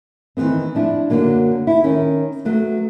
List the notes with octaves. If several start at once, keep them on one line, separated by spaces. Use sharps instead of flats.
D#3 E3 G3 B3 C4
F3 D4 E4
F#2 A#2 D3 F#3 A#3
E4
D#3 C#4
F#3 A3 B3